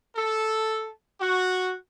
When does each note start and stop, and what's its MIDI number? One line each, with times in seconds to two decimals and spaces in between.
0.16 0.88 69
1.21 1.74 66